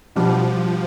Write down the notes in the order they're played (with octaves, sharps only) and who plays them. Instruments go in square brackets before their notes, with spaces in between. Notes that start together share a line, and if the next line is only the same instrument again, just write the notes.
[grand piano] B2 G3 D4 G4 [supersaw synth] F3